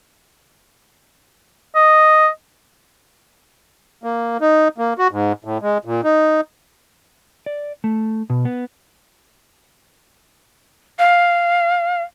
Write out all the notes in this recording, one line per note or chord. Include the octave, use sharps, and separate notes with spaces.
D#5
A#3
D#4
A#3
F#4
G#2
A2
G#3
A#2
D#4
D5
A3
B2
B3
F5